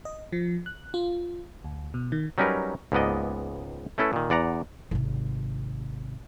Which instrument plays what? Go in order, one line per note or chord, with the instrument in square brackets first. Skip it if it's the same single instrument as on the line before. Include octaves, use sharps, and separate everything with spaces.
[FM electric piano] D#5
F3
F#6
F4
D2
B2
D#3
[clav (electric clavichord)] F#3 G3 C#4 D#4 A#4 B4
C#2 G#2 A#3 B3 D5 D#5
A3 C#4 E4 A4 B4
A#2 D#3
E2 D5 F#5 A#5
[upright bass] G#1 C3